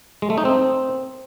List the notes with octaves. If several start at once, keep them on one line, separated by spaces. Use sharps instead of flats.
G#3
A3
D#4
C4